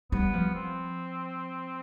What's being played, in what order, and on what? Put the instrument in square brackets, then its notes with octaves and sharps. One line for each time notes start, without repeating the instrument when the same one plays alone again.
[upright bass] G3 [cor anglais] B3
[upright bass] F3
[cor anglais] C4